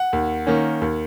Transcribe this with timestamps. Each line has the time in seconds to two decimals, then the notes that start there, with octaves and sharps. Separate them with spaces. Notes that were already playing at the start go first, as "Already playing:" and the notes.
Already playing: F#5
0.13 D#2
0.47 D#3 A#3 C#4
0.81 D#2